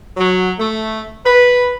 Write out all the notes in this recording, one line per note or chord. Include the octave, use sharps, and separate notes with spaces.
F#3
A3
B4